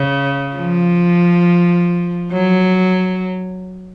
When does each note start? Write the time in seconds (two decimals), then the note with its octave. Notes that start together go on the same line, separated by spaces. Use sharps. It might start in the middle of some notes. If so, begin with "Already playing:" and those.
Already playing: C#3
0.56 F3
2.33 F#3